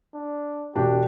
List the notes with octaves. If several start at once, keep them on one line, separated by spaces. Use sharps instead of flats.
D4
E1 D4 F#4 G4